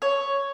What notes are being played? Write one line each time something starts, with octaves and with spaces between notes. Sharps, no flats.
C#5